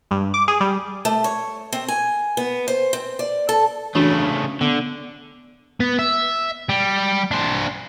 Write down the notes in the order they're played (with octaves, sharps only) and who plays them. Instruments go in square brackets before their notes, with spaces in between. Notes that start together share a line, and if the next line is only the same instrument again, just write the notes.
[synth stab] G2
D6
G#4
G3
[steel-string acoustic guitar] A3
C#5
C4
G#5
B3
C5
C4
D5
A4
[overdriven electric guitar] C#3 A3 [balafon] E3 D4 F#4
[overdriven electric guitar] D3 [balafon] B3
[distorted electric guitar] B3
E5
G3
D4 C5